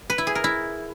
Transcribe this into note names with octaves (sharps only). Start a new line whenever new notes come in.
B4
E4
G#4
A#4
E4